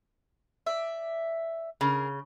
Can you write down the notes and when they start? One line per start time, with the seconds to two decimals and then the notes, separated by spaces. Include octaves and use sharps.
0.66 D5 E5
1.81 C#3 G#4 A#4